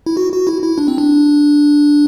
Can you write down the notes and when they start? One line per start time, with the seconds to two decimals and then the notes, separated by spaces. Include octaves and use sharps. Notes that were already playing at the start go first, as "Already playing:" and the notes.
0.06 E4
0.17 F#4
0.33 F#4
0.47 E4
0.63 E4
0.78 D4
0.88 C4
0.98 D4